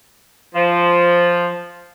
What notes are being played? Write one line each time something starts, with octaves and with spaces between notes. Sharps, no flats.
F3